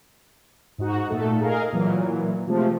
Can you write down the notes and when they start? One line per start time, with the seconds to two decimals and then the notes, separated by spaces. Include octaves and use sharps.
0.78 G#2 D#4 F#4
1.09 A#2 A3 A4
1.41 G#4 A#4 D#5 F5
1.73 A#2 E3 F#3
2.47 C3 F3 G#3 A3